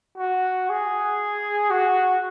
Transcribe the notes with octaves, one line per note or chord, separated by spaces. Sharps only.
F#4
G#4
F#4